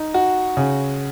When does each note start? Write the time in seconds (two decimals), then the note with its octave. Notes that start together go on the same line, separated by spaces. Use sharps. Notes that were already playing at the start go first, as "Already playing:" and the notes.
Already playing: D#4
0.14 F#4
0.57 C#3